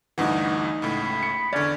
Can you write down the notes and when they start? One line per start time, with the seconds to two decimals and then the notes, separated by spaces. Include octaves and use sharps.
0.18 D2 G2 E3 D#4 F#5
0.82 C#2 A2 B5
1.22 C#7
1.53 E2 D3 C#4 D5